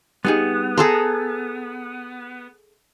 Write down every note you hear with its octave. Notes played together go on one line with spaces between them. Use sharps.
G3 B3 D#4 G#4
G#4 A4 A#5 C6